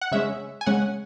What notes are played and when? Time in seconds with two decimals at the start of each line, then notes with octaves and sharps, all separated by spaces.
0.01 F#5
0.12 C#3 G#3 C#4 E5
0.61 G#5
0.66 C#3 G#3 C#4 F#5